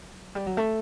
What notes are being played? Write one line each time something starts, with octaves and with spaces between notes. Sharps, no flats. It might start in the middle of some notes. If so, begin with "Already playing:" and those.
Already playing: F#3
G3
F#3
A3